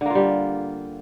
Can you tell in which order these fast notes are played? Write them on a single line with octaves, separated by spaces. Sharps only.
D3 A#3 F4 G3